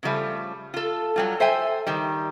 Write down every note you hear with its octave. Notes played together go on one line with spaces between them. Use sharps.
C#3 F3 G3 A3
F4 A4
F#3 G3 F4
A4 C5 E5 G5 G#5
D#3 G3